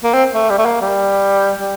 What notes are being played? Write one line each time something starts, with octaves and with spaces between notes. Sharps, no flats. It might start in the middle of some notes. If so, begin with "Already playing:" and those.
A#3
C4
A3
G3
A3
A#3
G3
G3